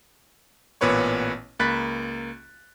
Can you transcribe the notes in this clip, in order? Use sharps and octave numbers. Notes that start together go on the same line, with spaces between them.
A1 A#2 B3 B4 C#5 C#6
C#2 A#3 B5 F#6 A6 B6